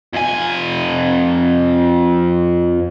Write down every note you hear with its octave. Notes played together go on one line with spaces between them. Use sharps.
F2 G#5